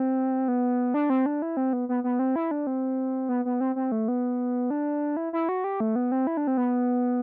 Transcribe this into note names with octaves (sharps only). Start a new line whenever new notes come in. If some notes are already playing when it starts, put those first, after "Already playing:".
Already playing: C4
B3
D4
C4
D4
E4
C4
B3
B3
B3
C4
E4
D4
C4
B3
B3
C4
C4
A3
B3
D4
E4
E4
F#4
G4
A3
B3
C4
E4
D4
C4
B3